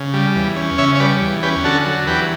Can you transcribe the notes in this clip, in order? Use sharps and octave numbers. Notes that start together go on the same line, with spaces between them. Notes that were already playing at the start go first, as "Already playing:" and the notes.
Already playing: C#3
G3
E2
C#4
C#3 C#5 E5
C#5
G3 B4 D5
E2
C#4 G4 B4
D3 F#4 A4
F#3
E2 G4 B4